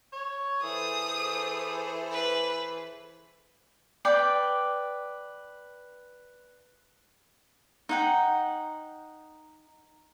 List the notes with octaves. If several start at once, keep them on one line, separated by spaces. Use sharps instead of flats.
C#5
E3 G#4 A4 C5 D#6
B4
B4 D5 G5
D#4 F#5 G5